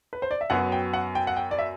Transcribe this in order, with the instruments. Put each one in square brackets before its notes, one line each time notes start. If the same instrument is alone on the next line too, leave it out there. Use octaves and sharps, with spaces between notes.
[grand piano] B4
C5
D5
E5
F#2 F#3 B3 F#5
G5
F#5
G5
F#5
G5
D5
E5